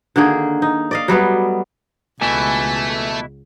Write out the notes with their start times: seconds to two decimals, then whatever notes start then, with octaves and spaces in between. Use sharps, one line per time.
0.16 D3 D#3 A#3 G#4
0.62 D#4
0.91 D5 D#5 F5
1.08 F#3 G3 A3 B3
2.22 C#2 B2 E3 A3 E4 G#5